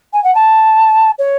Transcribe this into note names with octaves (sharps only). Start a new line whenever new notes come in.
G#5
F#5
A5
C#5